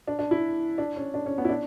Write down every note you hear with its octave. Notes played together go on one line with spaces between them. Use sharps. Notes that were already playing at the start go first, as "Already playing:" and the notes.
D4
D4
E4
D4
C#4
D4
C#4
B3
E4
D4